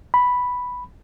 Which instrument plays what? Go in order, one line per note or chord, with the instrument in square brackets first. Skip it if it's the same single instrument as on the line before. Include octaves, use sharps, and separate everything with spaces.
[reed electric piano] B5